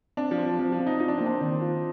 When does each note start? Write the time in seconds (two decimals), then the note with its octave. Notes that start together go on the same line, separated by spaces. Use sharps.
0.17 C4 D4
0.31 F3
0.38 F4
0.45 F3
0.59 F3 C4
0.72 F3
0.80 C4
0.87 D#4
1.00 D#4 F4
1.08 D4
1.18 A#3 C4
1.26 D4
1.41 D#3 C4
1.61 F4